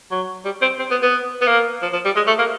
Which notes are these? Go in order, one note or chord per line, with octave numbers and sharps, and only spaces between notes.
F#3
G3
C4
C4
B3
B3
B3
A#3
F3
F3
G3
G#3
A3
A#3